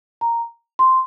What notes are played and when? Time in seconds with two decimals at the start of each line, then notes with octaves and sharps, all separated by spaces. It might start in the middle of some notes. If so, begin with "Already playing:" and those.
0.21 A#5
0.79 C6